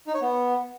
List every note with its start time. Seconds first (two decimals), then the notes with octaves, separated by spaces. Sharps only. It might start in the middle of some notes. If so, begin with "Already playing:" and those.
0.07 D#4
0.14 C#5
0.21 B3